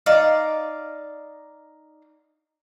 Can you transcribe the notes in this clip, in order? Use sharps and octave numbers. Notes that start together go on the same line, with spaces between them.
D#4 D5 F5